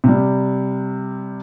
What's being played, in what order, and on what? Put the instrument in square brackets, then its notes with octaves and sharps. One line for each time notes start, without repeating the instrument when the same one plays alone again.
[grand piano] C3 G3